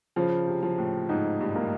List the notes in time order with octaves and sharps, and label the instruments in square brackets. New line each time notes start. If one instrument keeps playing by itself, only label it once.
[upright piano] C#3 [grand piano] F3
[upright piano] C3
[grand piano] F3
[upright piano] A2
[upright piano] G#2 [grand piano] D#4
[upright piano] G2
[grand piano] A#3